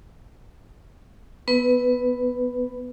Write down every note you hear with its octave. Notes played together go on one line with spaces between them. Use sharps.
B3 B4